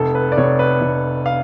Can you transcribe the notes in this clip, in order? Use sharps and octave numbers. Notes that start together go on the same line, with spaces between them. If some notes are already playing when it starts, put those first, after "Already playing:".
Already playing: F1 A4
B4
D5
F1 C#5
B4
F1
F5